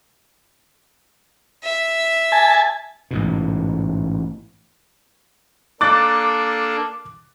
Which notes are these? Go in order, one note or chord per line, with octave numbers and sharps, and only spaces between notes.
E5
G#5 A5
A1 G#2 B2
A#3 D4 A4 D6 F#6 A6